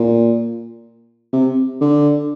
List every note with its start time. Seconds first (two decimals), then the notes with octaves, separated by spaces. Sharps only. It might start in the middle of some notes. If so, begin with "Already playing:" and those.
Already playing: A#2
1.33 C3
1.81 D3